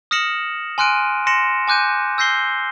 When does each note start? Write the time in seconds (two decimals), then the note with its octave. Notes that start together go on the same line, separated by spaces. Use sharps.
0.11 D#6 F6 A#6 C#7 E7 F#7
0.78 G#5 C6 F6 F#6 D7 D#7
1.27 C6 A#6 C#7 E7
1.68 G#5 D6 F#6 G6 D#7
2.18 E6 G6 A#6 C7 G7